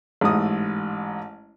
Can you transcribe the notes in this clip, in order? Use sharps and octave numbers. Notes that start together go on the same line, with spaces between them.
A1 G#2 D#6